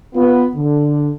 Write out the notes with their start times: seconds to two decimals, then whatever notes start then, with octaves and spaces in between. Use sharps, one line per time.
0.15 B3 F4
0.55 D3